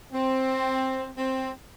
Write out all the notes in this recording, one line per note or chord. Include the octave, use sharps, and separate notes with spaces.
C4
C4